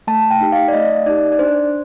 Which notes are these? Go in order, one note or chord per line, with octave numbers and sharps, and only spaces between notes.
A3 A5
G5
D#4 G4
F5
D5
A3 D#5
D#4 G4 D5
D5
D4 C5